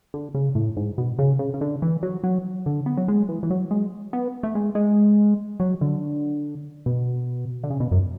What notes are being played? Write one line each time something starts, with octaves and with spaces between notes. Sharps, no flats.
D3
C#3
A2
G#2
B2
C#3
C#3
C#3
D3
E3
F#3
F#3
D3
B3
F#3
G#3
E3
E3
F#3
G#3
B3
A3
G#3
G#3
F#3
D3
B2
D3
C#3
B2
F#2